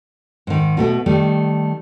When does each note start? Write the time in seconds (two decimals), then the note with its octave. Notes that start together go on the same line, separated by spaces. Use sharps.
0.47 G#2 D#3
0.77 B2 A3 B3
1.06 D#3 G3 A3